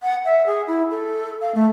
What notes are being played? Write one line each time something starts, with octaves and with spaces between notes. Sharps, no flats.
F#5
E5
G#4
E4
A4
F5
A3